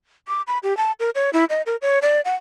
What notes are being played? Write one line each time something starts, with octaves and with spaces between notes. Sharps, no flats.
D6
B5
G4
A5
A#4
C#5
E4
D#5
A#4
C#5
D5
F#5